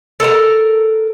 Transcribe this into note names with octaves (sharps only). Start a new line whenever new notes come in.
A4 A#4 F5 A#5